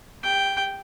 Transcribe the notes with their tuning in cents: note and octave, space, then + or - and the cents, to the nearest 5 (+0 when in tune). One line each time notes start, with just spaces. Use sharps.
G4 +40 G5 +0